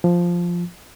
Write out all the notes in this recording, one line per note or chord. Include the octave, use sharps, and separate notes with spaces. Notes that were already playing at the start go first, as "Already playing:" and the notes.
F3